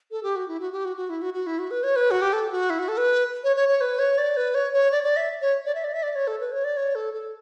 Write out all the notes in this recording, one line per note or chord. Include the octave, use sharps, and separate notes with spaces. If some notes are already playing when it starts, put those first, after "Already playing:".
A4
G4
F#4
E4
F#4
G4
F#4
F#4
E4
F#4
F#4
E4
F#4
B4
C#5
B4
F#4
G4
A4
F#4
E4
F#4
A4
B4
C#5
C#5
C#5
B4
C#5
D5
B4
C#5
C#5
D5
D5
E5
C#5
D5
E5
D5
E5
D5
C#5
A4
B4
C#5
D5
C#5
A4
A4